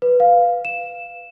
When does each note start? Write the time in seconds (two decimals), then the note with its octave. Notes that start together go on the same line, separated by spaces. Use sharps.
0.02 B4
0.20 F5
0.65 E7